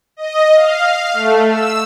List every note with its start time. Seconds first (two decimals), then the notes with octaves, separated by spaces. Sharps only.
0.17 D#5
0.55 F5
1.13 A3
1.50 E6